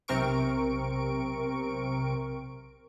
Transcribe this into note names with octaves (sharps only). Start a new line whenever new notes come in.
B1 C3 C4 A#4 C#6 D7